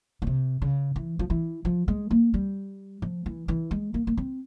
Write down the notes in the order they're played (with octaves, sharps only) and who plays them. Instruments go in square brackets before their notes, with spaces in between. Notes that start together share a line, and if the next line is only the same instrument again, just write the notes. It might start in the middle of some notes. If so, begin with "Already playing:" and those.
[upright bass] A#2
C3
C#3
E3
F3
E3
F3
G#3
A#3
G3
F3
E3
E3
G#3
A#3
A#3
C4